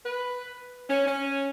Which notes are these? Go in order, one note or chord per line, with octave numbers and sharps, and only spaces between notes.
B4
C#4
C#4